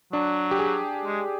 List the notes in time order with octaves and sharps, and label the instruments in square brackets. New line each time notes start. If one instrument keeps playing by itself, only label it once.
[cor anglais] F#3 [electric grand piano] D4
[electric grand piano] G4
G#4
[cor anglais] G#3